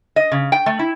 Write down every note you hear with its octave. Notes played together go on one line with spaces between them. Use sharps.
D#5
C#3
G5
A3
E4